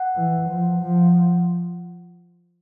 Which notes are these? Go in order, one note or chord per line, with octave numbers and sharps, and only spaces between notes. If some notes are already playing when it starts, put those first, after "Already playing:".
Already playing: F#5
E3
F3
F3